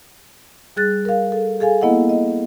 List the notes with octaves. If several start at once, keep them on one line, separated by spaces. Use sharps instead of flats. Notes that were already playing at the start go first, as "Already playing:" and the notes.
G3 G#4 F#6 A6
A#4 F5
A4
G#4 A4 F5 G#5
A#3 B3 E4 D#5 F#5
D#5